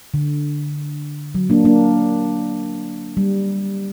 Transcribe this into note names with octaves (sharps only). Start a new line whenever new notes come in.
D3
F#3
A#3 D4
A#3 D4
G3